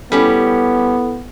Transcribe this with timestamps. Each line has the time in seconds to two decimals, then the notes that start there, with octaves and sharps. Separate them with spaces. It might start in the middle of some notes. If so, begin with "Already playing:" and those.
0.12 G3 B3 C#4 E4 G4 A4